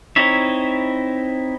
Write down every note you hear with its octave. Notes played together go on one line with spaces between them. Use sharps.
C4 D#4 E4 C#5 E5